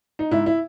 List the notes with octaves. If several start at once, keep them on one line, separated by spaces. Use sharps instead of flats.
D#4
G#2 E4
E4